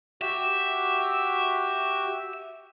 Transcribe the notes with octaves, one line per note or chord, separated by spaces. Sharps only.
F#4 G4 E5